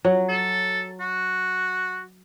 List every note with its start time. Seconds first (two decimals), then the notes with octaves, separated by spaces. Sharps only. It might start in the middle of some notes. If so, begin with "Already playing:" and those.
0.05 F#3
0.29 A4
1.00 F#4